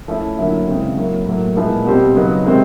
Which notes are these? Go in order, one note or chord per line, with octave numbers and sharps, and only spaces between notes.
F3 A3 C#4 E4
D3 F#3 A#3 C#4 E4
C#3 E3 G#3 C4
F#3 A#3 C#4 E4
A2 F#3 A#3
A#2 F3 G#3 B3 E4
B2 G3 C4
C#3 F#3 B3 D#4
C3 D#3 G#3 C4